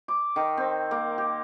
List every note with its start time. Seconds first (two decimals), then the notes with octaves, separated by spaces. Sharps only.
0.08 D6
0.36 D#3
0.57 C4
0.91 A#3
1.18 G4